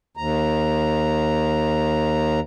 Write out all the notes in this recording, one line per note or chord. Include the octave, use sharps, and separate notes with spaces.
D#2 A#5